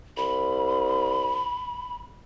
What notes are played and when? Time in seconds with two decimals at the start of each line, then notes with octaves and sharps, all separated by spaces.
0.17 C2 B5